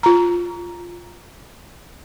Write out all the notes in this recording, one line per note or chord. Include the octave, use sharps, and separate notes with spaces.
F4 A#5